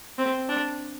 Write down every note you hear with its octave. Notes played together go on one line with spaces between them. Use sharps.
C4
D4